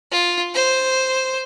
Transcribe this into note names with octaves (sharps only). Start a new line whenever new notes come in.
F4
C5